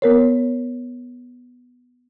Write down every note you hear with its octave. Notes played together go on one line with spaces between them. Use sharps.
B3 A#4 C#5